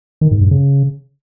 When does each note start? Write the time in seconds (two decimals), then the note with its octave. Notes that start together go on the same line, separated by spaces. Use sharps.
0.21 D#3
0.31 G#2
0.41 G2
0.51 C#3